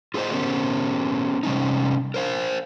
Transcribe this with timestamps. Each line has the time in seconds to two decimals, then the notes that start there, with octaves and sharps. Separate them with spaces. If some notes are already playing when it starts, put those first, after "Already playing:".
0.14 F4 G#4 A#4 C5 D#5
0.32 B3 C#4 G4 A#4 C5
1.43 C3 G3 C#4 D#4
2.14 A#4 C5 F5